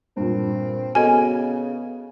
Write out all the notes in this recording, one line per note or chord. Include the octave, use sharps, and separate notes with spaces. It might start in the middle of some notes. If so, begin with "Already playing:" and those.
G2 A#2 C4
C#3 B3 F#4 A4 D#5 G#5